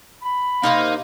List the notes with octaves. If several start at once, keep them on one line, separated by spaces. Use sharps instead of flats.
B5
C3 A#3 D#4 C5 F5